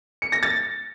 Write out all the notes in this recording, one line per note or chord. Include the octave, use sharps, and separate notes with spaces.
C#7
A#6
A6